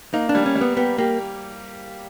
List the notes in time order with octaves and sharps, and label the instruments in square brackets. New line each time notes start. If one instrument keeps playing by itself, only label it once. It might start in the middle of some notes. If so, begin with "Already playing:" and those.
[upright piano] A#3 [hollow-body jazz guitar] D#4
[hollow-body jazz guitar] D4
[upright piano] G3
[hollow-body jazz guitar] C#4
[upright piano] G3
[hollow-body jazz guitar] B3
[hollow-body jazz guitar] B3 [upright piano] G4
[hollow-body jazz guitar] A#3 [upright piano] G4